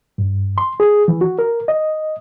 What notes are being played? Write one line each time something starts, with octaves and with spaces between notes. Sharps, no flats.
G2
C6
G#4
E3
F#4
A#4
D#5